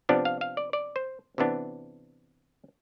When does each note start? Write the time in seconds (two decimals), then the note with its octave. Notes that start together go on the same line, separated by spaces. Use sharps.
0.09 C3 F3 B3 D4 D5
0.25 F5
0.41 F5
0.57 D5
0.73 D5
0.96 C5
1.38 C3 E3 B3 D4